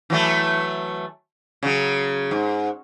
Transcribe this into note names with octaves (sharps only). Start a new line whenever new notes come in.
E3 F#3 A3
C#3 F#3
G#2